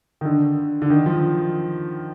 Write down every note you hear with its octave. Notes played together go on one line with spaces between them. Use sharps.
D#3
D3
D3
D#3
F3